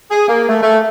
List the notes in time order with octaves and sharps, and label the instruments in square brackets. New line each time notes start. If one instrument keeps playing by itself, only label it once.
[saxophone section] G#4
A#3
A3
A3